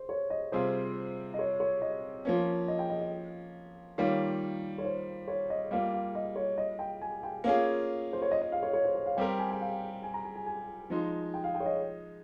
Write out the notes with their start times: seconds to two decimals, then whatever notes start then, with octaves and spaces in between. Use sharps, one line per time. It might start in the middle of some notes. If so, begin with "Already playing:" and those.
Already playing: C5
0.09 C#5
0.30 D#5
0.52 C3 G3 C4 F4 G#4 C5
1.34 D#5
1.39 C#5
1.60 C#5
1.82 D#5
2.25 F3 A#3 C#4
2.68 D#5
2.79 G5
2.90 D#5
3.01 D#5
3.98 D#3 G3 A#3 F4 C#5
4.78 C#5
4.85 C5
5.28 C#5
5.50 D#5
5.71 G3 A#3 F4 F5
5.93 F5
6.15 D#5
6.36 C#5
6.58 D#5
6.79 G5
7.01 G#5
7.23 G5
7.44 A#3 C#4 F4 G#4 F5
8.13 C5
8.22 C#5
8.31 D#5
8.42 D#5
8.52 F5
8.63 C#5
8.73 C#5
8.84 C5
8.95 C#5
9.06 F5
9.17 G3 C4 G4 A#4 G5
9.39 G#5
9.51 G5
9.61 F5
10.03 G#5
10.14 A#5
10.25 G#5
10.36 G#5
10.46 G#5
10.90 F3 G#3 D#4
11.34 G5
11.44 F5
11.55 G5
11.60 C#5
11.66 D#5